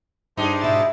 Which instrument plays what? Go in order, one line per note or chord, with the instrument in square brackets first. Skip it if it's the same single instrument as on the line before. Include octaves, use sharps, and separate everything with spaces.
[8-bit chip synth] G2 [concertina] D4 G4 C5 [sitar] D#4 G#4
[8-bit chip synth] G#2 B2 A6 [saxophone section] E4